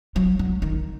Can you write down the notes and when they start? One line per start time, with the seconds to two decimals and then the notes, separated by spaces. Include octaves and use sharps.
0.16 F#3
0.39 F#3
0.62 D#3